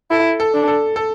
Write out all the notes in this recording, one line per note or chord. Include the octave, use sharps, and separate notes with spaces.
E4 A4
A4
D4
A4
A4